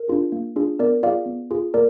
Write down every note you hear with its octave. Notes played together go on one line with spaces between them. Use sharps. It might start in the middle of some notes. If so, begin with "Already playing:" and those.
Already playing: A#4
D4 F4 G#4
A#3
D4 F4 G#4
B3 A#4 D5
F4 G#4 D5 F5
B3
F4 G#4
A#3 A#4 D5